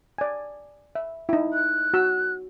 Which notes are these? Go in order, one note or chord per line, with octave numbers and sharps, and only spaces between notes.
D5 G#5
E5
D#4 E4
F#6
F#4 E6